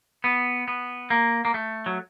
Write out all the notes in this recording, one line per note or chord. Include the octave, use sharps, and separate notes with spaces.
B3
B3
A#3
A#3
A3
F#3